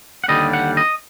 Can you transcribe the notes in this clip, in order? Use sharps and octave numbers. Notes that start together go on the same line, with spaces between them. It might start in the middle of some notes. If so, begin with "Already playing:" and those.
F#5
D#2 D3 G3 D#5
F#5
D#5